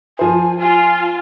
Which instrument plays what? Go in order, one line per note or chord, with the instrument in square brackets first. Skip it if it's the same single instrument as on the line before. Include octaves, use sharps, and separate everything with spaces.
[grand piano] F3 C5 [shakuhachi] G#5
[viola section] F4 [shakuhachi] G#5